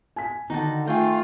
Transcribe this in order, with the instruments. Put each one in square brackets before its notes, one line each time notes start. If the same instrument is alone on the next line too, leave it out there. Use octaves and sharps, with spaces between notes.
[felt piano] G#5 B6
[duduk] D3 [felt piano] D#3 [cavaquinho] D#4 F#4 A5
[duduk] A3 [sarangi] F4 [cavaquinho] G#4 G5